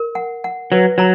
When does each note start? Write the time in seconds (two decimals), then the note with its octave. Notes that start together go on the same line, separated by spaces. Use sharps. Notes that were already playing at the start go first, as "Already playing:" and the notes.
Already playing: A#4
0.15 F#5
0.44 F#5
0.72 F#3 B4
0.98 F#3 A#5